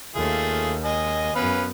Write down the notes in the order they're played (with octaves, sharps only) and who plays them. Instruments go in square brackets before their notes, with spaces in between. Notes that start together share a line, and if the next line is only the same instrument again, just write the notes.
[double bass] D#2 [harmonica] A3 F4 G#4
[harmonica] D#5 G#5
[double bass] F#2 B3 [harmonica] C#4 B4 F5